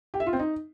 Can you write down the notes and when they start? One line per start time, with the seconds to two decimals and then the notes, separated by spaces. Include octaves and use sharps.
0.14 G4
0.20 E5
0.26 F4
0.33 C4
0.39 D#4